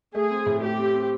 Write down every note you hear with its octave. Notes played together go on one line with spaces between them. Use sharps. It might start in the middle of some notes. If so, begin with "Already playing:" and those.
A3 G#4
C4
A2
A3 G4
C4
C4